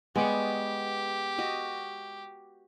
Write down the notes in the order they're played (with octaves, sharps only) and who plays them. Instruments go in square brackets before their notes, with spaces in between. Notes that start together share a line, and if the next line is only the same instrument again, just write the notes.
[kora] G#3 [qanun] B3 D5 C#6 [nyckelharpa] G4
[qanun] F#4 D#5